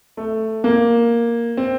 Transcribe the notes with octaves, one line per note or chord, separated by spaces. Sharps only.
A3
A#3
C4